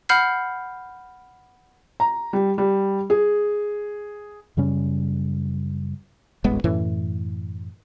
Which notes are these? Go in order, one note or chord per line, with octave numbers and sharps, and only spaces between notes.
F#5 B5 F6 G6 C7
A#5
G3
G3
G#4
F#2 C#3 G3 C#4
D#1 A1 G#3 B3
F#2 A2 E3